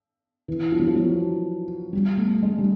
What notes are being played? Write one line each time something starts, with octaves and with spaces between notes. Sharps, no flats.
E3
F3
F#3
F3
F#3
G3
A3
G#3
G3